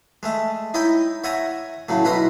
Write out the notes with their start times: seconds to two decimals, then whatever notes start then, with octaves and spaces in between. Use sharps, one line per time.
0.23 G#3 A3 E5
0.74 D#4 E4 C#5 D#5 G5
1.24 C#5 E5 F#5 G#5 A#5 C#6
1.89 A2 C#3 F#3 A3
2.04 B1 E4 F#4 B4 A#5 C6